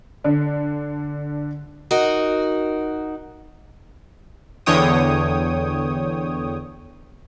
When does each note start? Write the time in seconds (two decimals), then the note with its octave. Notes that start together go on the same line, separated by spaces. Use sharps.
0.24 D3 D4
1.91 D#4 F#4 A#4
4.66 E2 D3 C#5 G5 D#6